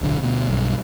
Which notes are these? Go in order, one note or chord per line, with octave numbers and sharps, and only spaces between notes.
D1 B1 D3
D2 B2
B1 G2